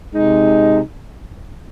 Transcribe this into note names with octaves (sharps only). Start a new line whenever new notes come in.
C3 G#3 D#4